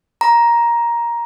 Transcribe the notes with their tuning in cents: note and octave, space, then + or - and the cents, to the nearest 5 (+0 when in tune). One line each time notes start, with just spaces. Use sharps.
A#5 +10